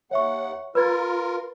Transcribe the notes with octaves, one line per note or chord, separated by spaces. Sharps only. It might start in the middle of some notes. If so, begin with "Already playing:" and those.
D#2 C#5 E5 F#5 C#6
F4 A#4 B4 B5 G#6 A6